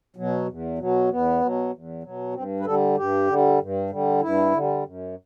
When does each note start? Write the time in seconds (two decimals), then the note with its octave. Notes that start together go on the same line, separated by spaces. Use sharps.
0.16 B2 F#3
0.48 E2
0.78 B2 F#3
1.09 E2 B3
1.41 B2 F#3
1.72 E2
2.03 B2 F#3
2.34 G2 C4
2.60 B4
2.65 D3 G3 A4
2.97 G2 G4
3.27 D3 G3
3.59 G2
3.90 D3 G3
4.21 G2 E4
4.52 D3 G3
4.84 F#2